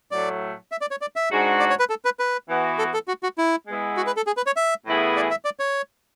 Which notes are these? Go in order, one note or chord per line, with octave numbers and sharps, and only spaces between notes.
A2 F#3 A3 D5
E5
D5
C#5
D5
E5
G#2 G#3 D4 F#4
D5
C#5
B4
A4
B4
B4
E3 B3 F#4
A4
A4
F#4
F#4
E4
G#3 B3 E4
F#4
B4
A4
G#4
B4
C#5
E5
A2 E3 B3 E4 G#4
D5
E5
D5
C#5